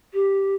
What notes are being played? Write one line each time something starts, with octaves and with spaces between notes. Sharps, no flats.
G4